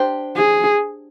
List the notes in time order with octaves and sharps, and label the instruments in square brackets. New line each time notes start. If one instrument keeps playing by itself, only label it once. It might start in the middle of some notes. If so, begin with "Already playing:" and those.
Already playing: [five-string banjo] D4 G4 C5
[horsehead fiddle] G#4